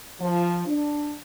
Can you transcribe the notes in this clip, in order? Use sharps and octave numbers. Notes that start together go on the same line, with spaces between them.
F3
D4